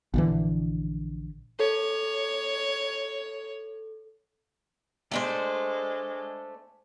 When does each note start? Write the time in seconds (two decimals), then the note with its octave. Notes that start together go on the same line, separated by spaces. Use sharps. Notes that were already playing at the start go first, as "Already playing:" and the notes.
0.14 A#1 D3 E3
1.60 A4 C#5
5.11 G#3 A3 D4 C5